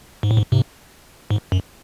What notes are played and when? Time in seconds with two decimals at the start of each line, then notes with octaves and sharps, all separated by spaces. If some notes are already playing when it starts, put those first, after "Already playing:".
0.23 G#2
0.31 A2
0.37 G#2
0.52 G#2 C3
1.31 G#2
1.52 F#2